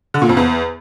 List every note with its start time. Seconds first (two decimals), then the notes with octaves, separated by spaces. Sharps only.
0.14 D3
0.22 A#2
0.29 F2
0.37 E2